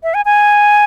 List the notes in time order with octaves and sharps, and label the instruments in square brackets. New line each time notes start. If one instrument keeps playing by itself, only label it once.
[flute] E5
G#5
G#5